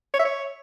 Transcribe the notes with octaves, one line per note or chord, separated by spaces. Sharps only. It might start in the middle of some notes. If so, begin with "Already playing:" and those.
C#5
E5
C#5